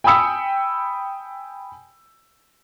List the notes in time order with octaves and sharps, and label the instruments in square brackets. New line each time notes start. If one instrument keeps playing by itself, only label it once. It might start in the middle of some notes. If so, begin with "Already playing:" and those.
[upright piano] G5 G#5 B5 D#6 E6 C#7